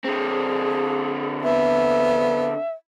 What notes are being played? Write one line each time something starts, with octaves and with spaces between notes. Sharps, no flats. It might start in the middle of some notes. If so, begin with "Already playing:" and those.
D3 C4 G#4
B3 E5